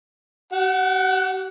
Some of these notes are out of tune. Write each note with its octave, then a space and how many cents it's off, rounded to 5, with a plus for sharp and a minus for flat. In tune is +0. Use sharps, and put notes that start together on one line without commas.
G4 -45 F#5 +0